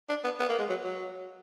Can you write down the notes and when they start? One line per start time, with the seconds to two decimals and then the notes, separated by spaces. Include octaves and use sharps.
0.09 D4
0.24 B3
0.40 B3
0.50 A#3
0.59 G#3
0.69 F#3
0.84 F#3